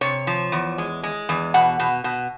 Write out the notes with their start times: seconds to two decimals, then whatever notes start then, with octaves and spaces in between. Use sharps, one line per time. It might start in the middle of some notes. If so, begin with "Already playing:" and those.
0.01 C3 C#5
0.27 F3
0.52 E2
0.78 G#3
1.03 G#3
1.29 E2
1.54 B2 F#5
1.80 B2
2.04 B2